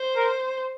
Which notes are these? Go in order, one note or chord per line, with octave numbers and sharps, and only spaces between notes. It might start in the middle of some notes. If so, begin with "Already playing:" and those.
Already playing: C5
A#4